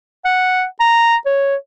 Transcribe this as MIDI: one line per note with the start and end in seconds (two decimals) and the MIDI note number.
0.25 0.64 78
0.80 1.16 82
1.26 1.55 73